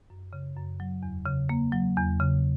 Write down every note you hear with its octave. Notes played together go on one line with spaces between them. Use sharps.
F#2
C#3
F#2
F#3
E2
C#3
A#3
F#3
E2
C#3